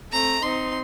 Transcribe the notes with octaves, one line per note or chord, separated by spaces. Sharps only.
A3 C4 A#5
C4 D#4 C6